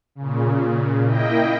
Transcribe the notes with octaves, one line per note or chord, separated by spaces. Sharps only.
A#2 C#3
A#3 E4 D#5 G5